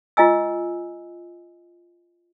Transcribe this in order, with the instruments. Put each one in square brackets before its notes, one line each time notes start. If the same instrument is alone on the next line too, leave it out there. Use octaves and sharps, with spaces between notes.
[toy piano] F4 D#5 G#5 E6